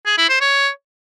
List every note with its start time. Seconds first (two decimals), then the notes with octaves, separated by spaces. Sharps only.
0.06 G#4
0.18 E4
0.29 C5
0.41 C#5